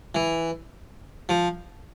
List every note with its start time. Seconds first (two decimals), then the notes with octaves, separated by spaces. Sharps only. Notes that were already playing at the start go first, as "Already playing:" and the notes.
0.15 E3
1.29 F3